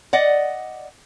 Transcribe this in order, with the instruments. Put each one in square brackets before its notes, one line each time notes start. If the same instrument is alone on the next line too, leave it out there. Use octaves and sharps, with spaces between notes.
[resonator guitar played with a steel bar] D5 D#5 F#5